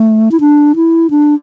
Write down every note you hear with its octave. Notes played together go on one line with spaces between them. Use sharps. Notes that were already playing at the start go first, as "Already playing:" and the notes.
Already playing: A3
E4
D4
E4
D4